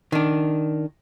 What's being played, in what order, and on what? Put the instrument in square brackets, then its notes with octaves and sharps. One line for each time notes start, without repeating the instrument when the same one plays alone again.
[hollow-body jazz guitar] D#3 D4